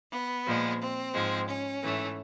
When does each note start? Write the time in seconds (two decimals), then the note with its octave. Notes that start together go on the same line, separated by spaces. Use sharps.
0.11 B3
0.46 A#2 F3 G#3
0.80 C4
1.13 G#2 F3 G#3
1.47 C#4
1.82 G#2 E3 A3